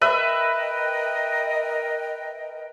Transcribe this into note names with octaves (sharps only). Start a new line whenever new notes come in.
A#4 B4 D#5 E5 G5